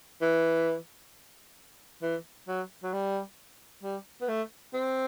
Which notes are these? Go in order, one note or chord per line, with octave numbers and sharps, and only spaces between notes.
E3
E3
F#3
F#3
G3
G3
B3
A3
C4